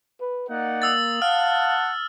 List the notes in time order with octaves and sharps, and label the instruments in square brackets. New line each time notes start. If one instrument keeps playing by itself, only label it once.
[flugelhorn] B4
[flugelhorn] A#3 [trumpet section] D#4 D5 F#5
[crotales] D#6 E6 A6
[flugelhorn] F5 [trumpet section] F#5 A5 [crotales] F6